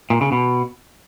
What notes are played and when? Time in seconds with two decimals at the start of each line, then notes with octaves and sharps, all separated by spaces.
0.10 A#2
0.21 C#3
0.32 B2